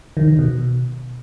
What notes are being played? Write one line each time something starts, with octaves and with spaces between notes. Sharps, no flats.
D#3
D#3
B2